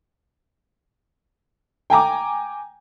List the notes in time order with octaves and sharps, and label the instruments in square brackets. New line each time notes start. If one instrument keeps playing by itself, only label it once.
[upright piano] G5 G#5 A#5 D6